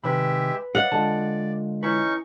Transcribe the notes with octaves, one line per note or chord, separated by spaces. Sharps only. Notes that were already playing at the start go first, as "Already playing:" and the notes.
C3 D#3 G#3 G4 B4 E5 B5
D5 D#5 F5 F#5
D3 G#3 F4 A5
C#4 D#4 E4 B4 C#6